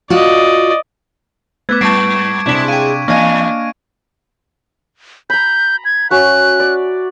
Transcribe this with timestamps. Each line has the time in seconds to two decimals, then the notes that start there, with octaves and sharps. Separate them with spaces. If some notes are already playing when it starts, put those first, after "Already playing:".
0.10 F4 F#4 D5 D#5
1.69 A3 B3 B4 D6 G#6
1.81 G#2 G3 B4 A5 C#6 C7 D7
2.46 C3 G#3 D4 E4 B6
2.68 F5 G5 D#7
3.08 E2 A#3 D4 D#5 F5 G#5 C#6 D#7
5.30 A#5 B5 G6
5.85 G#6
6.11 C#4 F#4 E5 F#6
6.60 D5